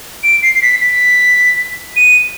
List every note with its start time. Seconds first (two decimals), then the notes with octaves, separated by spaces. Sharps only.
0.23 D7
0.43 C7
0.55 C7
0.62 B6
0.81 B6
1.96 D#7